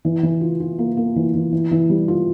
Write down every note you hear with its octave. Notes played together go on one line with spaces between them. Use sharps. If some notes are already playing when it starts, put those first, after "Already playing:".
E3
E3
F4
F4
A#3
A#3
E3
E3
E3
E3
G3
F4